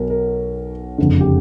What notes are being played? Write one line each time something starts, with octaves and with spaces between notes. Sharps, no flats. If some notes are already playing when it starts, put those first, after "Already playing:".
Already playing: B1 B2 F#3 A#4
A#4
F#1 F2 D3
G4